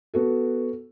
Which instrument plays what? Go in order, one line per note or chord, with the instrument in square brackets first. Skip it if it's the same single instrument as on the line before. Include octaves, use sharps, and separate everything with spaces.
[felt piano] B3 F#4 A4